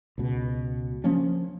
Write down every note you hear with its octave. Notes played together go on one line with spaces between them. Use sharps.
C#2 B2
F3 A#3 C#4 D4